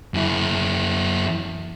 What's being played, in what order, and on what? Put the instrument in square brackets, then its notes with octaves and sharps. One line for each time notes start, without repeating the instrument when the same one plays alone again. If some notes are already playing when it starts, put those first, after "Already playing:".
[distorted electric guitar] F#2 E4